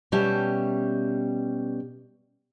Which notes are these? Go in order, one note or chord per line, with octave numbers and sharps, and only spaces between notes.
B2 G3 C#4 G4 E5 A5